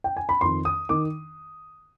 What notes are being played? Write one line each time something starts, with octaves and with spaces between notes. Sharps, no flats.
G5
G#5
B5
F2 D#3 C6
D#6
D#3 D6